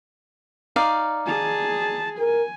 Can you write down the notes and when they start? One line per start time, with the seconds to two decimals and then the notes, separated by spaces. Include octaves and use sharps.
0.76 D#4 D5 F5
1.27 G#4 A5
2.19 A#4 G#5